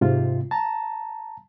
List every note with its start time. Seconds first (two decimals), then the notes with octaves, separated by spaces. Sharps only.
0.01 G#2 C3 F4
0.51 A5 A#5